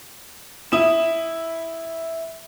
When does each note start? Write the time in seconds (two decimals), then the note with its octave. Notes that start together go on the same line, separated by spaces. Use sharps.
0.72 E4 D#6 E7